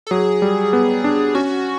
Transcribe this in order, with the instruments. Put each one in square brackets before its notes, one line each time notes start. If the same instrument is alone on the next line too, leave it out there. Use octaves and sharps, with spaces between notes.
[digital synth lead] A4
[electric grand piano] F#3 [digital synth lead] G#4
[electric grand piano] G3
B3
D4
[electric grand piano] C#4 [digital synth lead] F#4